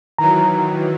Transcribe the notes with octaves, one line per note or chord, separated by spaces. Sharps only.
D#3 E3 F#3 A#5